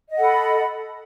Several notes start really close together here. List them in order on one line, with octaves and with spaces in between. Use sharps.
D#5 F#5 A4 B5